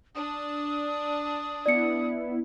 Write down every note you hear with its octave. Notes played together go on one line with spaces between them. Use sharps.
D4 D#6
B3 E4 D5 C#7